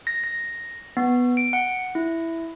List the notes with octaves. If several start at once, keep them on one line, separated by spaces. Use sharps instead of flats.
A#6
A#6
B3
D7
F#5
E4